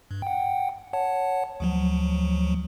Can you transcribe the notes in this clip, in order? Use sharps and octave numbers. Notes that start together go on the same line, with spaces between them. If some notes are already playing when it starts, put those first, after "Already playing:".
G2
F#5 G5
C#5 F#5 A5
D2 F3 F#3